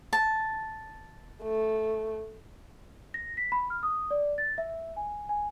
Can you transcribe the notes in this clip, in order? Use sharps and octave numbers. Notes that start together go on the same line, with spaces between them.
A5
A3
A#6
B6
B5
F6
D#6
D5
A6
E5
G#5
G#5